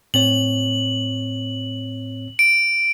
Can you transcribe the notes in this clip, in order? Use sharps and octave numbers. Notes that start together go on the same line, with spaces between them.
A2 C4 C#5 F#7
D7